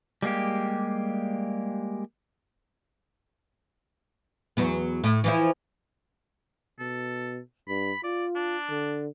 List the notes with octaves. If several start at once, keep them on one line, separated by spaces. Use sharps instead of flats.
G3 G#3 A#3 G4
E2 F#3 B3
A2
E3 F3 E4
B2 A4
G2 B5
F4 D5
D4
D3